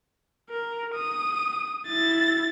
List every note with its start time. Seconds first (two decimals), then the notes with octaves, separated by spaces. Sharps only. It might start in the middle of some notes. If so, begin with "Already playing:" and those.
0.50 A#4
0.95 D#6
1.87 E4 A6